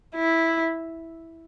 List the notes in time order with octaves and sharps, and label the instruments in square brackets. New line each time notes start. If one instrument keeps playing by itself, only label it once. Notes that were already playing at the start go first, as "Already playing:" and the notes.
[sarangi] E4